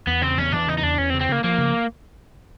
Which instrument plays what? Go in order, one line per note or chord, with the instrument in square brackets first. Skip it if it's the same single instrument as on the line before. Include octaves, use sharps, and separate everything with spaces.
[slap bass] E2 [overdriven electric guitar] B3
[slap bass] C#3 [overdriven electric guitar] C4
[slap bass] E2 [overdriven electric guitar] C#4
[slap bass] E2 [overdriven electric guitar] D4
[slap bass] C#3 [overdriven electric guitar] D#4
[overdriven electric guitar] D#4
[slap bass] E2 [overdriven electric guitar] D4
[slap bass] E2 [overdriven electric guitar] C#4
[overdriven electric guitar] C4
[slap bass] C#3
[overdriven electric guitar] C4
[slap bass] C#3 [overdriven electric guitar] A#3
[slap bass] F3 [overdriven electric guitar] A#3
[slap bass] C#3